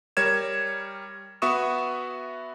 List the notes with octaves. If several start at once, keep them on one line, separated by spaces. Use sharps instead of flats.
G3 A#4 C#5 G#6 E7
B3 F#4 E5 C#6 D#6 E7